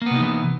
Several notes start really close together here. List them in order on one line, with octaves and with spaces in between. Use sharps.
A#3 B3 C3 D#4 E3